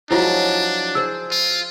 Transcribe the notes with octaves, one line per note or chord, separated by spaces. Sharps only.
F3 F#3 G#3 D4 E4 F4 C#5
G#4 C5 E6
F4